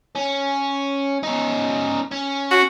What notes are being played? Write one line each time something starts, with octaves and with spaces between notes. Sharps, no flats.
C#4
C#4 D#4
C#4
F#4